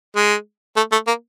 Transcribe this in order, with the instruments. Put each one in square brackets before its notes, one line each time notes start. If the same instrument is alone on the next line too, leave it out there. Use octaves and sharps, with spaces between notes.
[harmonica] G#3
A3
A3
A#3